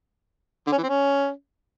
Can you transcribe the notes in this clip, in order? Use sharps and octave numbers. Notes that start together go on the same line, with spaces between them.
D3
C#4
E3
C4
C#4